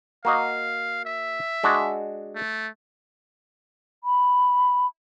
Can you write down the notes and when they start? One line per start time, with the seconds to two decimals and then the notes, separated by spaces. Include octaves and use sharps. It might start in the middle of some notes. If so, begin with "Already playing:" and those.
0.25 A#3 F#4 D#5 F5
1.05 E5
1.64 G#3 D4 F#4
2.35 A3
4.04 B5